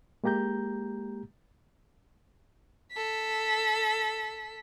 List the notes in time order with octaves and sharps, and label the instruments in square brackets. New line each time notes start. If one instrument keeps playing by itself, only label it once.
[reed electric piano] G#3 A#3 G4 A#5 G6
[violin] A4 B6